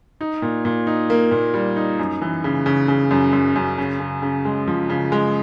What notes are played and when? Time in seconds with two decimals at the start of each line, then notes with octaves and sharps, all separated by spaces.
0.21 D#4
0.42 A#2
0.65 A#2
0.87 D#4
1.10 A#3
1.31 A#2
1.54 G3
1.76 D#4
1.99 F#2
2.22 E3
2.44 C#3
2.66 C#3
2.88 C#3
3.11 F#2
3.33 F#2
3.56 F#2
3.78 C#3
4.00 C#3
4.22 C#3
4.45 G#3
4.68 F3
4.90 C#3
5.12 G#3